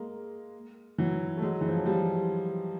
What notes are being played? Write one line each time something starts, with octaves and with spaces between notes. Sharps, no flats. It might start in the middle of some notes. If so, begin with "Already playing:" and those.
Already playing: G#3 A#3
E3 F#3
A3
F#3 G#3
E3
F3
F#3
F3 G3